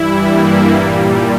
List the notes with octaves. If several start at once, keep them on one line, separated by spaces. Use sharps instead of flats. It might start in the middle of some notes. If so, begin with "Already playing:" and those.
Already playing: G2 E3 G3 E4
A#3
A#2 G3